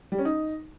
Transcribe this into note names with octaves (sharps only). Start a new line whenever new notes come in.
G3
C#4
D#4